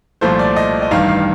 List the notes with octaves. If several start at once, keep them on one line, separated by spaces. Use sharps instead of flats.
C2 A#2 F3 A3 C5
D5
D#5
D#5
A1 G2 D#3 F5
F5